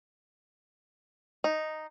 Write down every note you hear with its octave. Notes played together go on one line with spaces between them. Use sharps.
D#4